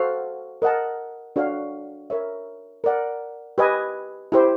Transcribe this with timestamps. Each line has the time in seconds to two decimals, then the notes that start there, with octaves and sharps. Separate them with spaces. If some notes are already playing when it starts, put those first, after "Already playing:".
Already playing: F#4 A4 C5 F5
0.62 A#4 D#5 F#5 A5
1.36 D4 F#4 A4 C#5 F5
2.10 A#4 C#5 E5
2.84 A#4 D5 F#5
3.58 G4 B4 D#5 G#5
4.32 E4 G4 C5